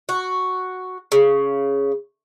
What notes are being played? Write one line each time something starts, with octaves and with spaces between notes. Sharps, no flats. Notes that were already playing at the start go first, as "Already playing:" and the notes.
F#4
C#3